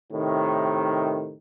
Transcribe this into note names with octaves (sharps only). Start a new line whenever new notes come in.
A2 C3 D#3